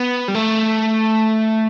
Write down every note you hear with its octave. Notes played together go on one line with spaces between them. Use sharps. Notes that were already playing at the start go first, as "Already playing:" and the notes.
Already playing: B3
G3
A3